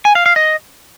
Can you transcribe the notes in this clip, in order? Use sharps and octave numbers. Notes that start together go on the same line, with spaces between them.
G#5
F5
F5
D#5